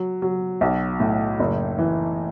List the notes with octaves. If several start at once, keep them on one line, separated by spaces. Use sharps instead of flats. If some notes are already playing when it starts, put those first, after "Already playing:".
Already playing: F#3
F#3
B1
A2
F#1
E3